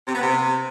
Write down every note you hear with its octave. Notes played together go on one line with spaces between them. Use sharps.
C3
B3
C3